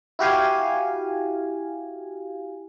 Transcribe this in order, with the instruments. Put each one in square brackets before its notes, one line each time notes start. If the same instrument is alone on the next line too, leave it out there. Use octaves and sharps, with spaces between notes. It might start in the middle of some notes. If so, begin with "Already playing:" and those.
[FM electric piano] E4 F#4 G4 F5 G#5